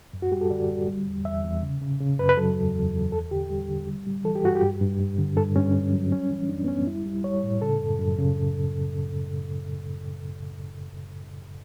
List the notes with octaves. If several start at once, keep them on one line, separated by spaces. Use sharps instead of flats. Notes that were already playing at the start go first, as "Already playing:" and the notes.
F#2
F#4
G3 G4
A4
D3 D5
G3
G3
E2
E2 E5
E2
C#3
C#3
C#3
F#2 B4
B4
F#3 A4
E2
E2
E2
E2 A4
D3 G4
G3
D3
G3
G3
E3 A4
G4
G2 F#4
G4
G2
G2
G2
D3
G2 A4
G2 C#4
G2
F#3
G3 C#4
E3
F#2 D4
B3
F#2 C#4
G3 E4
G3
G3 C#5
A2
C#3 A4
F#2
F#2
C#3